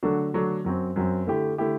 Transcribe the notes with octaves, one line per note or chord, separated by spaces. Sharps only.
D3 F#3 A3 D4 F#4
D3 F#3 A3 D4 F#4
F#2 F#3 C4
F#2 F#3 C4
D3 A3 E4 G4
D3 A3 E4 G4